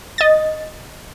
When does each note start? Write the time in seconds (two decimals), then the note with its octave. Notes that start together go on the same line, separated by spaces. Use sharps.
0.18 D#5 A6